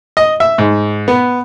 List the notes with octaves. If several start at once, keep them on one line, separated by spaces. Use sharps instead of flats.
D#5
E5
G#2
B3